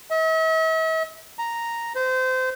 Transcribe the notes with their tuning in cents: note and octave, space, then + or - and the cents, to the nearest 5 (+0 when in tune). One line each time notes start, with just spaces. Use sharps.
E5 -45
A#5 +0
C5 -25